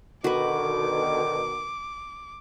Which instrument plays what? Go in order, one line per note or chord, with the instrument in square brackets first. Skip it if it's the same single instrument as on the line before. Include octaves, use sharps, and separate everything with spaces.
[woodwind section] B2 D3 D#3 [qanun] F#4 B4 [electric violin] D6